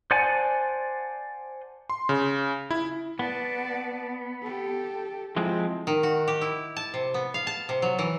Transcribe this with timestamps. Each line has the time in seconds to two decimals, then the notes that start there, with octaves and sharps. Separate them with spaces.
0.11 C5 D5 F#5 G#5 A5
1.90 C6
2.09 C#3
2.71 E4
3.19 B3 D5 A5
4.42 G4 A4
5.36 F3 G#3 C4 E4
5.87 D#3
6.03 F#4
6.28 G4
6.41 E4
6.77 A5
6.94 C3
7.14 B3
7.34 F5
7.47 A5
7.69 C3
7.82 F#3
7.99 E3